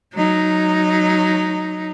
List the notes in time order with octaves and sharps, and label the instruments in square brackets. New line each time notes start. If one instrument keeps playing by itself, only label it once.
[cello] F#3 D#4